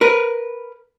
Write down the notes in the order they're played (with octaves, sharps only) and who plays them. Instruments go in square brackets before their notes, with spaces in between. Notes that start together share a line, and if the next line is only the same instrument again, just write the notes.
[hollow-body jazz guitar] A#4 B4